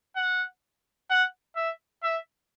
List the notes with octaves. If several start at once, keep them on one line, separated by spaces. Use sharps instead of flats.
F#5
F#5
E5
E5